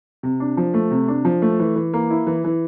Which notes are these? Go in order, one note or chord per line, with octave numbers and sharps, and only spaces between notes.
C3
D4
F3
A3
C3
D4
F3
A3
E3
E3
A#3
E4
E3
E3